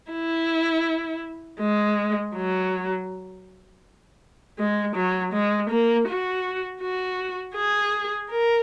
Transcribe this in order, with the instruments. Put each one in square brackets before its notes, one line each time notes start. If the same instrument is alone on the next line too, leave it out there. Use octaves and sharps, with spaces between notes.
[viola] E4
G#3
F#3
G#3
F#3
G#3
A#3
F#4
F#4
G#4
A#4